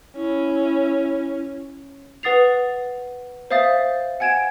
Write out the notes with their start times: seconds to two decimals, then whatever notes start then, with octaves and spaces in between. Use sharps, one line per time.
0.16 C#4 E4
2.23 B4 F#5 D#6 A6 C7 F7
3.51 C5 E5 F5 D#6 A6
4.20 F#5 G#5 G#6 D7 E7